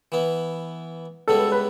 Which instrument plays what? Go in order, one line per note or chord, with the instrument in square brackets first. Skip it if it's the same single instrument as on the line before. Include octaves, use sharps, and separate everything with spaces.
[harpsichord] E3 B3 E4
[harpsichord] C#2 C#3 G3 B3 E4 [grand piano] A4
[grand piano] B4